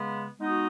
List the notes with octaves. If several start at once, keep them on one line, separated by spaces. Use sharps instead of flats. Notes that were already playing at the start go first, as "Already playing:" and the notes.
Already playing: C#3 G#3 B3
G#3 B3 D#4 F#4